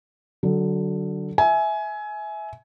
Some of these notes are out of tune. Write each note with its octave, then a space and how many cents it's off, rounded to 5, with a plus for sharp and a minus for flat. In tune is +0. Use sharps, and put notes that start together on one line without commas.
D3 +0 F#3 +20
E5 -10 G#5 +20